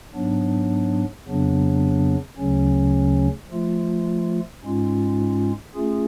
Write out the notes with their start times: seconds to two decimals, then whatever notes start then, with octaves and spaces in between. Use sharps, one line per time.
0.15 G#2 F#3 B3 D4
1.26 F2 C#3 F#3 B3 D4
2.38 D2 C#3 F#3 C#4
3.50 F3 A3 F4
4.62 G#2 G#3 C#4 F4
5.74 A3 C#4 F4 G#4